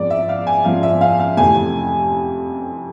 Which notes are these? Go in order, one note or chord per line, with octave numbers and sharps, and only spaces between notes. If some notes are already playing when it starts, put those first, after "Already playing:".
Already playing: G#2 F3 G#3 C4 D5
E5
F5
G#5
G#2 F3 G#3 C4 F5
E5
F5
F5
F2 C3 E3 A3 G#5